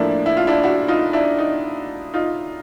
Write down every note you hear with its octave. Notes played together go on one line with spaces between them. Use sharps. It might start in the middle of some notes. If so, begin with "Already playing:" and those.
Already playing: A2 F3 A#3 D4 E4
E4
F4
D4 E4
E4 F#4
D#4 F4
D4 E4
D#4
D#4 F4